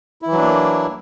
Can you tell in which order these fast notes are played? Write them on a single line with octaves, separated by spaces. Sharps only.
E4 E3 F#3 D4 A#3